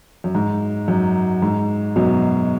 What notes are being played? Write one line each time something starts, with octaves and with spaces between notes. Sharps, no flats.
F#2
G#2
F#2
G#2
F#2 B2